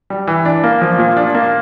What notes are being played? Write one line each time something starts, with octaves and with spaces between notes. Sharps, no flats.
G3
E3
D4
A#3
F3
A#2
D4
A#3